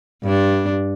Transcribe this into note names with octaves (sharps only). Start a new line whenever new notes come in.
G2 D4